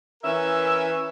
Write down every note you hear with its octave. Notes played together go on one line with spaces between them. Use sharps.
E3 C#4 A#4 E5